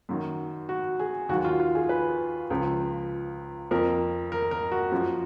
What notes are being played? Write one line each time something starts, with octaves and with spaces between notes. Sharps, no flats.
F#2 D#3 F#3
F#4
G#4
D#2 D#3 F#3 F#4
F4
F4
G#4
B4
C#2 C#3 F3
F2 F3 A#4
A#4
A#4
F#4
F#2 F3